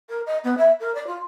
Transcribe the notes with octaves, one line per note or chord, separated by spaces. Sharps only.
A#4
D#5
B3
E5
A#4
D5
F4